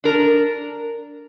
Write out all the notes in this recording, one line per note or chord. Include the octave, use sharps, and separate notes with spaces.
D4 A#4